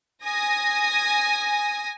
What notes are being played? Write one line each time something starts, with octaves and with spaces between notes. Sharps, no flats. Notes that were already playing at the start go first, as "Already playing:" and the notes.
G#5 D#6 A#6